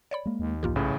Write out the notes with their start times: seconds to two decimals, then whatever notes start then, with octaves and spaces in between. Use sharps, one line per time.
0.11 C#5 D5 B5
0.26 G#3 A#3
0.39 D#2
0.63 B1 G#2 E3 A#3 F4 G4
0.76 A1 A2 C#3